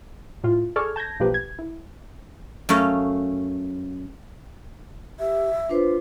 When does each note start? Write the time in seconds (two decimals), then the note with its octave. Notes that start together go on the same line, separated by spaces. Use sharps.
0.44 A2 F4
0.76 G#4 A4 D5 C#6 F6 G#6
0.96 A5 G6 G#6 A#6
1.20 B1 F3 A#3 G4 B4
1.34 G#6
1.59 E4
2.69 F#2 A3 C#4 F5
5.19 G4 E5
5.69 D4 F4 B4 C5